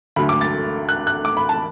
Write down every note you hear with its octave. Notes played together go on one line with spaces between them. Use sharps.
D2 D3 F#3 A3 B5
D6
A6
F#6
F#6
D6
B5
A5